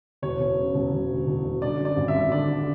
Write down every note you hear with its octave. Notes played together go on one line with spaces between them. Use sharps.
E1 C#5
E1
C#3
E1
E1
D2
E1
E1
D3 D5
F#2
D5
G#1
E5
G#1
D3 D5
D3